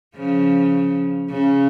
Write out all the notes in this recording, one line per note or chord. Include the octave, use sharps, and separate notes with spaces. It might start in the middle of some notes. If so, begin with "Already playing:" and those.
C#3 F3
C#3